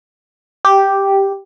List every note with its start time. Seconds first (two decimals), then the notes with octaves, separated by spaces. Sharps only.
0.65 G4